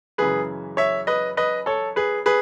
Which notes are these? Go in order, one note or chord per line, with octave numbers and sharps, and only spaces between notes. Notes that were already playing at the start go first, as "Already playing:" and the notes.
F#2 C#3 E3 G#3 G#4 B4
C#5 E5
B4 D#5
B4 D#5
A4 C#5
G#4 B4
G#4 B4